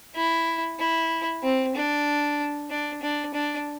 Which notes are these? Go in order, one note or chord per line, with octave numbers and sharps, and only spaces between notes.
E4
E4
C4
D4
D4
D4
D4